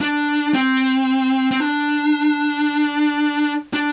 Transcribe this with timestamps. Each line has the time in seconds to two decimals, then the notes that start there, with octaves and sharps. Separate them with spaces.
0.01 D4
0.54 C4
1.51 C4
1.60 D4
3.73 D4